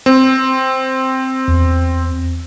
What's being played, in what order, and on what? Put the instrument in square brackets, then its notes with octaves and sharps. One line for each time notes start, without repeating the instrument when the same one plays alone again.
[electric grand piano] C4
[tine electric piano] E2